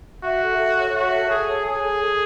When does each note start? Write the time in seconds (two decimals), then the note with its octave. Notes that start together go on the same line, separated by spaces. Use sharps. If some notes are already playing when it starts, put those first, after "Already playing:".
0.23 F#4 E5
0.41 A4
0.58 A4
0.76 C#5
0.94 F#4 E5
1.11 A4
1.30 G#4 A4
1.48 C#5
1.65 G#4 G#5
1.83 A4
2.01 A4